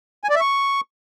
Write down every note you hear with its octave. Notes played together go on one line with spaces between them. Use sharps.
G#5
D5
E5
C#6